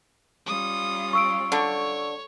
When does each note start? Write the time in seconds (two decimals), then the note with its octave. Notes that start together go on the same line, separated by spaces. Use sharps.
0.46 G3 C#4 F4 D#6
1.13 C#6 E6 D7
1.52 D3 C#5